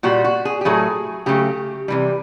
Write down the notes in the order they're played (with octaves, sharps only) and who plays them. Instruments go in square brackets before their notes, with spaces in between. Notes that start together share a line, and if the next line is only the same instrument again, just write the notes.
[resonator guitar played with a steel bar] A#2 G3 F#4
F#4
G#4
G4
A2 F#3 A3 G#4
C#3 F#3 A3 G4
C3 E3 G3